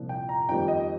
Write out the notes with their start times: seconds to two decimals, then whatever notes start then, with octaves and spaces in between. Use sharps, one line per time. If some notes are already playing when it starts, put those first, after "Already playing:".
Already playing: C2 A#2 F3
0.09 G5
0.29 A#5
0.49 F2 D#3 G3 A#3 G5
0.68 D#5